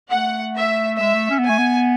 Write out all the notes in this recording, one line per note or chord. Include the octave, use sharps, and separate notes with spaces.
A3 F#5
E5
G#3 E5
A3
C#4
B3
A3 G#5
B3